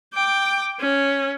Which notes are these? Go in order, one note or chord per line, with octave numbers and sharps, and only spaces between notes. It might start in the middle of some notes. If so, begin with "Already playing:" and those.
G5 D6
C#4